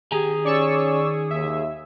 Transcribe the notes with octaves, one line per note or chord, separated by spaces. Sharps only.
D#3 G4 G#4 G#5 A#5
C#4 D5 C#6 E6
D#2 E5